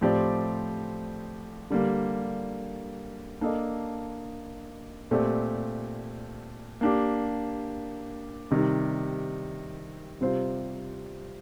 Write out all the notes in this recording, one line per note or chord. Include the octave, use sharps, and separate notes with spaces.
A2 F3 C4 G4 D5
D3 G3 A#3
A#3 D4 A4 D#5
A#2 A3 C4 G4 D5
A#3 D4 G4
C3 D#3 G3
C3 G3 C4 F4 C5